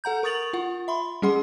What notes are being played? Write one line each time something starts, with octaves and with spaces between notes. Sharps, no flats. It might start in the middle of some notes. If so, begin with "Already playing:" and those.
A4 F#5 A#5 G6
A#4 C#6 D#6 A6 F7 F#7
F4 F#5
E5 B5 C6
G3 C#4 G#4 F#5 C6